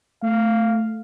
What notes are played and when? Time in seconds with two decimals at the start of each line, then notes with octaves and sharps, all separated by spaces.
0.22 A3 F5